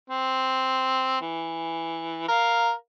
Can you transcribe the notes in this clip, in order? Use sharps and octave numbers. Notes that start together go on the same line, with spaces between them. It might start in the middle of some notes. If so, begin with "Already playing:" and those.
C4
E3
A#4 F5